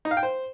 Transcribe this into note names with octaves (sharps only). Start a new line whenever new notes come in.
D#4
F5
G5
C5